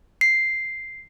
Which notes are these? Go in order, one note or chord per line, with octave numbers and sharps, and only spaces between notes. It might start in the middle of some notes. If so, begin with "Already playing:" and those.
C7